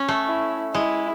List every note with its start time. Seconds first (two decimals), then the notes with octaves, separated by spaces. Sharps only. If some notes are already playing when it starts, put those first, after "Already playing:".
Already playing: C#4
0.08 A3
0.26 E4
0.74 G#3 E4